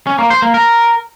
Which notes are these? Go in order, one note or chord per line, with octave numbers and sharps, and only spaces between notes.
C#4
A#3
C5
A#3
A#4